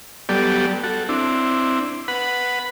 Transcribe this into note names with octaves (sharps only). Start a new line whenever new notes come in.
F#3 G3 B3 G4 A4 D5
F#4 A4
C4 D4 E4
B4 F#5 B5